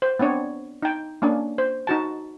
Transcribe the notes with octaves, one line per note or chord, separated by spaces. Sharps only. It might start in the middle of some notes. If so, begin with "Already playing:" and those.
C5
B3 C4 D4 C#5 D5
D#4 G5
A#3 C#4 D4
C5
D#4 F#4 A5